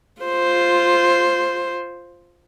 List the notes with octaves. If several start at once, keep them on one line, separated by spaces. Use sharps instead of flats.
F4 C5